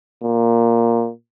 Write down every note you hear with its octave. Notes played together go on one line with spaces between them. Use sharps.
A#2